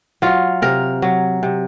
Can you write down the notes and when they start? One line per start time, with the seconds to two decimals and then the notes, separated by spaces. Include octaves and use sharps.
0.22 F#3 F4
0.62 C3 A#4
1.02 F#3
1.43 C3